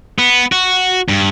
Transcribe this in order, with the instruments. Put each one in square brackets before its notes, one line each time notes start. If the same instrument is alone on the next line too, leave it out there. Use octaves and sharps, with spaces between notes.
[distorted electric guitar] B3
F#4
G2